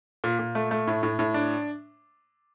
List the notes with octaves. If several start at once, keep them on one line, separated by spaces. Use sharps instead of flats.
A#2
A#2
A3
A3
A2
A2
A2
D4